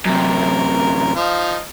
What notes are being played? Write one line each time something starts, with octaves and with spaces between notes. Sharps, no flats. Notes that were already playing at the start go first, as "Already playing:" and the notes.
F#2 C3 A#4
F3 D#4 F5